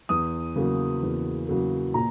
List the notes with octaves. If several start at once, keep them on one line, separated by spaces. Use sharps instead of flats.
E2 D#6
C#3 F#3 A#3
E2
C#3 F#3 A#3
A#2 A#5